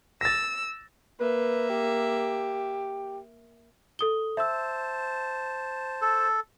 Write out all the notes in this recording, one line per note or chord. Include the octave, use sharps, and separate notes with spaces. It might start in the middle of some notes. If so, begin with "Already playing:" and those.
E6 A6 A#6
A#3 B4 E5
G4
A4 D#6 G7
C5 E5 A5 E6
A4